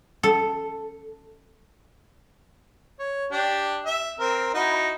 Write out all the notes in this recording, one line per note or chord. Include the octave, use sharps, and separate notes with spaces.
A4
C#5
D4 G4
E5
C4 A#4
D#4 E4 F#4